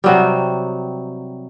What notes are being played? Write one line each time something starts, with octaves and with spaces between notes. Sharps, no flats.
C3 F#3 G3